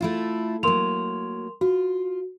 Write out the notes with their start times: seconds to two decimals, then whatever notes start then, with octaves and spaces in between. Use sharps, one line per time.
0.01 A3 E4 F4
0.63 F#3 A#3 A#4 C6 F7
1.61 F4 F#4